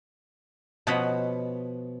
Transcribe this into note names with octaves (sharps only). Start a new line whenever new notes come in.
B2 F3 C#5 D#5 F#5 B5